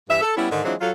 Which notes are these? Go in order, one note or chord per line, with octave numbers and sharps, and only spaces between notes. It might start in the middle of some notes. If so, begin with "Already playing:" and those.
G2 E3 E5
A4
G3 B3 C#4 E4
G#2 D3 D#3
E3 F#3 G#3 C4 D4 F4
F#3 F4 A4